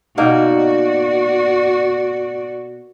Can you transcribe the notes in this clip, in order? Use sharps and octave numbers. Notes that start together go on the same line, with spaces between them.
B2 A#3 D#4 F#4 D5